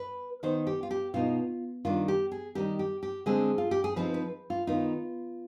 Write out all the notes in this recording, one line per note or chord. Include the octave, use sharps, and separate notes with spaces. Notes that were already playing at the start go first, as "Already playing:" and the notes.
Already playing: B4
D#3 B3 D#4 C5
G4
F4
G4
B2 B3 D#4 F4
D#3 G3 D4 F4
G4
G#4
D#3 G3 B3 D#4 G4
G4
G4
D3 G#3 C4 G#4
F4
G4
G#4
F3 C4 D#4 B4
B4
F4
D#3 B3 D#4 F4